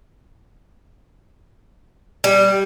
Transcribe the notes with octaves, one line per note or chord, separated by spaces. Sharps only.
G3